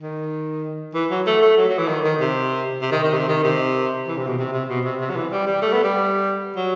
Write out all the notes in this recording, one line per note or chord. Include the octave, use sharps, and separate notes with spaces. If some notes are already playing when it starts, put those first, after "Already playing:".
D#3
E3
F#3
A3
A3
F#3
F#3
E3
D#3
D#3
C3
C3
D#3
D#3
C3
D#3
C3
E3
C3
B2
C3
C3
B2
C3
C3
F#3
E3
G3
G3
A3
B3
G3
F#3